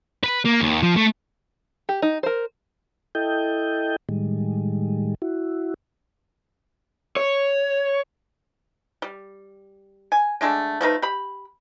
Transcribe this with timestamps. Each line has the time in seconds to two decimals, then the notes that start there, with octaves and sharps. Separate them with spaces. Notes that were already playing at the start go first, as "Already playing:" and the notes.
0.24 B4
0.45 A#3
0.61 D#2
0.83 F3
0.96 A3
1.89 G4
2.02 D#4
2.23 A#4 C5
3.15 E4 A4 D#5 G5 G6
4.09 A2 D#3 G3 G#3
5.22 E4 F#4
7.16 C#5
9.02 G3
10.12 G#5
10.41 D3 G#3 A3 D4
10.81 F3 A3 D#4 B4
11.02 G4 B5